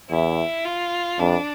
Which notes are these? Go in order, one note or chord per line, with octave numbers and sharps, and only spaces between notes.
E2 E4
F4
F2 D4